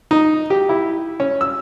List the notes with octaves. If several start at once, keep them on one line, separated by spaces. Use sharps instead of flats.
D#4
G4
E4
C#4
E6